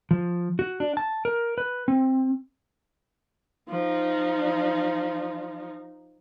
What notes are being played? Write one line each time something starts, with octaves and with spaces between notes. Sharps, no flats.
F3
F#4
D4
A5
A#4
B4
C4
F3 D#4